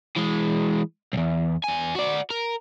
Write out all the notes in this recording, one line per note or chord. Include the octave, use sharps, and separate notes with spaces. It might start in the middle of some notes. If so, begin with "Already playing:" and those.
E3 G#3
B1 E2
E2 G#5
F#4 D5
A#4